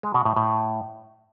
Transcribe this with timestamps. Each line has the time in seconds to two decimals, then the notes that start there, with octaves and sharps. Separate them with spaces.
0.03 G#3
0.14 B2
0.25 A2
0.36 A2